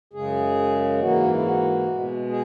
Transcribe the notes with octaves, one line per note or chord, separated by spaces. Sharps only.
F#2 C#3 G#3 G#4
G#2 E3 A#3 F#4
E4
F#4
B2 G#3
G#4